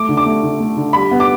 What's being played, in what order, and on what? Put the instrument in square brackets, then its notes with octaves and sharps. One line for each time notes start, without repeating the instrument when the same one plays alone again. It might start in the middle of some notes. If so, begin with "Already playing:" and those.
Already playing: [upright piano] A3 D6
D3
D6
A3
D3
A3
D3
G3 B5
B3
D6